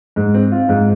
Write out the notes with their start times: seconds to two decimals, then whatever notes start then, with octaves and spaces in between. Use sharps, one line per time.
0.16 G#2
0.34 C4
0.51 F4
0.69 G#2